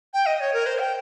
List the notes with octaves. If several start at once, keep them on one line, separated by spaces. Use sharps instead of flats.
G5
D#5
C#5
A#4
C5
G5